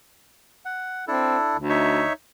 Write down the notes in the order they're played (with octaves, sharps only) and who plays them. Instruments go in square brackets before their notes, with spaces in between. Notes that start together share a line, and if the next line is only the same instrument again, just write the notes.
[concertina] F#5
[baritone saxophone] C4 [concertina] D4 E4 A4
[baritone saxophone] D2
[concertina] D#4 C#5 E5